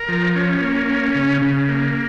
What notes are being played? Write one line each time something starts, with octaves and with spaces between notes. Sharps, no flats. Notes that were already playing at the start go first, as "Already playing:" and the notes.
Already playing: A#4
F3
C#4
A#3
C#4
C#3
C#3
A#3